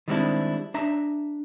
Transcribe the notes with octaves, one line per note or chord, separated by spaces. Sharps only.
D#3 G3 G#3 C4 D4 E4
D4 E5 A#5